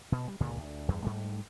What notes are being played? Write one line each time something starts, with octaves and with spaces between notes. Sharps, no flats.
B2
G3
C#2 G2 A#2 D3
D2
E2 G2
G#2 G3 A3